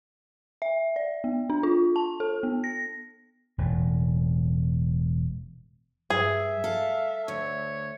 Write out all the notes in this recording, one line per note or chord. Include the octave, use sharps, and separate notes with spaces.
E5
D5
B3
D4
F4
A5
A4
B3
A#6
E1 A2
G2 G#4 E5
A4 F5
D2 C#5